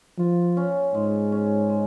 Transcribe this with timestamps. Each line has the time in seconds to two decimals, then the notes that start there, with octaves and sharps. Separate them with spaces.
0.18 F3 F4
0.57 C#4
0.94 G#2 G#3
1.32 C#4
1.70 G#3